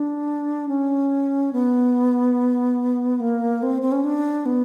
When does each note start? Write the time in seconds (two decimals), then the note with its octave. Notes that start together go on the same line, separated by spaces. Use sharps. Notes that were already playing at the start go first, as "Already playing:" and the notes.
Already playing: D4
0.69 C#4
1.53 B3
3.20 A#3
3.63 C4
3.82 C4
3.92 C#4
4.04 D4
4.46 B3